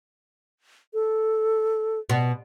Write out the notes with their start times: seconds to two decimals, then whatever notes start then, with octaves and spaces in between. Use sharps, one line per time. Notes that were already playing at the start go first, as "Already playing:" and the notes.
0.94 A4
2.10 B2